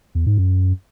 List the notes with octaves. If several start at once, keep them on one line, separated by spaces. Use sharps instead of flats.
E2
G#2
F#2